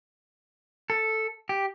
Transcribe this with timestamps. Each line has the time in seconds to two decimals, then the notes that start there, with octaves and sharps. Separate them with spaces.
0.90 A4
1.49 G4